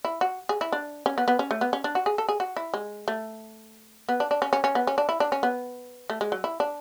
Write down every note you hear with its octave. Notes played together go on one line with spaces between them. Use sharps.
E4
F#4
G#4
E4
D4
C#4
B3
B3
C#4
A3
B3
C#4
D4
F#4
G#4
A4
G#4
F#4
E4
G#3
A3
B3
D4
D4
C#4
C#4
C#4
B3
C#4
D4
E4
D4
C#4
B3
A3
G#3
F#3
E4
D4